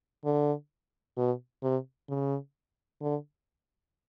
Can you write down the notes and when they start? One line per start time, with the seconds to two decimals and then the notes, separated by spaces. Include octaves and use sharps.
0.25 D3
1.17 B2
1.63 C3
2.09 C#3
3.01 D3